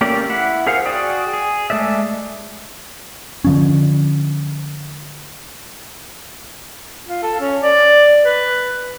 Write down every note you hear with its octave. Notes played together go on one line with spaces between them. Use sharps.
A3 A#3 C#4 G4 D5
E4 F#5
G#4 A#4 C5 F5 F#5
F#4 G#4 D5 G5 D#6
G#4
G#3 A3 B4 D5 E5
D3 F3 C#4
F4
A4
C#4
D5
B4